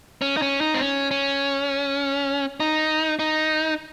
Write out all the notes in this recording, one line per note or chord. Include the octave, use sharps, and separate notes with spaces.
C#4
D#4
C#4
D#4
C4
C#4
C#4
D#4
D#4